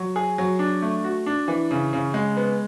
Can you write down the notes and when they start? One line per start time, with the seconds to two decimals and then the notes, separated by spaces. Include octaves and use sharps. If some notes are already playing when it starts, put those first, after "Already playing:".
Already playing: F#3
0.16 G#4
0.38 F#3
0.59 D4
0.82 A3
1.04 F#4
1.26 D4
1.48 E3
1.71 C#3
1.93 C#3
2.14 G#3
2.37 B3